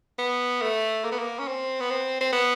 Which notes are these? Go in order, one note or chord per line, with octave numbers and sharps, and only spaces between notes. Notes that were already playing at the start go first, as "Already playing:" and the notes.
B3
A3
A#3
B3
A#3
C#4
C4
B3
C4
C4
B3